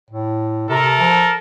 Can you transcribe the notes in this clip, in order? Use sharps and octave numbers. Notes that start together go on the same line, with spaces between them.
A2
C3 A4 A#4
F3